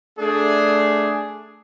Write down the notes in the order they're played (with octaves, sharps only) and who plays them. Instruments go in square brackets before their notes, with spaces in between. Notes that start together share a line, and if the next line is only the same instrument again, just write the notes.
[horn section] A3 D4 G#4